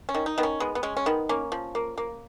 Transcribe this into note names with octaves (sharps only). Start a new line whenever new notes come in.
C#4
D#3
D#4
D#3 B3
C#4
G#3 B3
B3
G#3 C#4
C#4
D#3 B3
A#3 C#4
F3
A#3
A#3